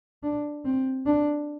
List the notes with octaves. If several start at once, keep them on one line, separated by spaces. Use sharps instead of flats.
D4
C4
D4